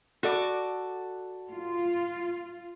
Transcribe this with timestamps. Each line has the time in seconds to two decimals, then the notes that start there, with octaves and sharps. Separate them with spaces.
0.23 F#4 A4 D5
1.52 F4